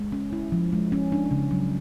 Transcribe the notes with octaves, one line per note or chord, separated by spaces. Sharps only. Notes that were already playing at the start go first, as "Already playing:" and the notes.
Already playing: G#3
C#4
E4
F3
G#3
C#4
D4
C#3
F#3